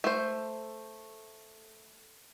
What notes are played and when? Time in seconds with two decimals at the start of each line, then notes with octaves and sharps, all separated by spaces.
0.04 A3 C5